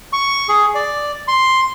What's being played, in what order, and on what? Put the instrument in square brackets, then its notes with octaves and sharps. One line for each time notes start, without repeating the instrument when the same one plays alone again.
[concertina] C#6
G#4
D5
C6